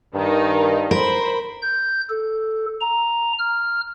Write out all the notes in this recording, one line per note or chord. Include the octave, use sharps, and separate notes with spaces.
G2 D#3 D#4
A#4 C5 B5
G6
A4
A#5
F6